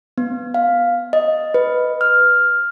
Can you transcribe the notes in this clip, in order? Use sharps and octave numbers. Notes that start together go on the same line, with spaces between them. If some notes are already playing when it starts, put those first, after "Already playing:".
B3
F5
D#5
B4
F6